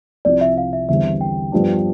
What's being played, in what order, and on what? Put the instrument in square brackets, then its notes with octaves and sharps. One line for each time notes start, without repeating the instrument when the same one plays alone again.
[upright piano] C2 C3 F3 [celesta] D5
[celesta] E5
F5
E5
[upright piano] E2 D3 G3 C4 [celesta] E5
[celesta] G5
[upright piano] G2 F3 B3 D4